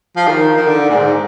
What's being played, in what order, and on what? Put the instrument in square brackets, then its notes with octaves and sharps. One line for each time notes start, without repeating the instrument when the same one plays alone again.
[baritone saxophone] F3
D#3
D#3
D3
A#2
G#2